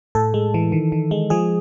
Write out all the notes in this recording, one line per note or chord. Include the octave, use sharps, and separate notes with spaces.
A2 A4
G#3
E3
D#3
D#3
G#3
F3 G#4